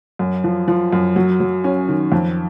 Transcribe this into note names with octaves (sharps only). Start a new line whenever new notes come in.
F#2
F3
F3
F#2
F#3
F#3
C#4
D#3
F2